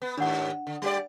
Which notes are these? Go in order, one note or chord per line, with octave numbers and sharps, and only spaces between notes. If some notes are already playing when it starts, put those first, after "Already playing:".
B3
D#2 G#2 D4 F#5
D3
G3 G4 D5